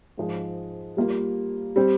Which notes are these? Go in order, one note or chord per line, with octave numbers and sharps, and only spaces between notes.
G#2 F3 G#3
G3 A#3 F4 A#4
G3 C4